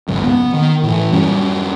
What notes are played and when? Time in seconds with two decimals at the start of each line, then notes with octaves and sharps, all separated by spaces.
0.08 G#1 C#2 F#2
0.24 B3
0.54 D#3
0.83 A2 E3
1.13 F#2 G3 C#4